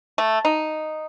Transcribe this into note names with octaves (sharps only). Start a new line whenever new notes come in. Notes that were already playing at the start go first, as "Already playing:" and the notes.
A3
D#4